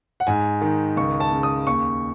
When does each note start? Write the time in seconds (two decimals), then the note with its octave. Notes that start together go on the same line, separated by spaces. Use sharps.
0.20 F#5
0.27 G#2 G#5
0.61 D#3
0.96 C#2 C#6
1.20 A5
1.31 C#3
1.43 D#6
1.67 D#2 C#6